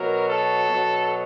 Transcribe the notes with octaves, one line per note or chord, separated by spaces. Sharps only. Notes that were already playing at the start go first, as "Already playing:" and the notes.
Already playing: B2 F#3 A#4
A4
B2 F#3